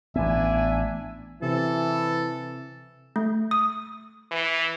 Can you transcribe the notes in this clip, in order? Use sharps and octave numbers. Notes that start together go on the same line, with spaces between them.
A1 B3 D4 E5 G#5
C3 E3 C4 A4
A3
D#6
E3